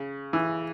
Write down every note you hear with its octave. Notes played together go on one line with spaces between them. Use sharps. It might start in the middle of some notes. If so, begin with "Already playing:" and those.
Already playing: C#3
E3